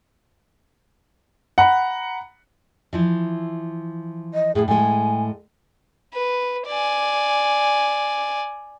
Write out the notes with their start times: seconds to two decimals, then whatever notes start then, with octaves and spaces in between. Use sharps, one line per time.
1.58 F#5 A#5 B5
2.93 E3 F3 E4
4.34 D#5
4.55 A2 G#4
4.68 A2 G#3 G#5
6.13 B4
6.67 D5 G#5